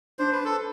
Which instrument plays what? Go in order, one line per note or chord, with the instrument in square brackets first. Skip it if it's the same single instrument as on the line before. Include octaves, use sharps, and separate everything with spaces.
[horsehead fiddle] D4 [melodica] C5
[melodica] B4
A4